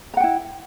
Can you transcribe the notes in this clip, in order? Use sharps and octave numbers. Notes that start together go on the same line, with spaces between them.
E4 F#5 G5 A#5